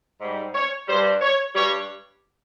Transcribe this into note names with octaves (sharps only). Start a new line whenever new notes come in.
G#2 G3
C#5
G2 G3 C5
C#5
G2 G3 C#5